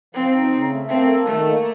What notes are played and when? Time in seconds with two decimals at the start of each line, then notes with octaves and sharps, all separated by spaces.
0.14 F3 C4
0.33 D#4
0.52 C#3
0.71 A3
0.89 A#3 C4
1.08 A4
1.26 D#3 A3
1.46 A#3